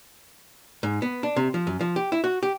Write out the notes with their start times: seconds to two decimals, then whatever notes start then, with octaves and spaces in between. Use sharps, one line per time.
0.83 G#2
1.02 B3
1.23 D4
1.36 C3
1.54 F3
1.67 F#2
1.81 F3
1.96 G4
2.12 E4
2.24 F#4
2.43 G4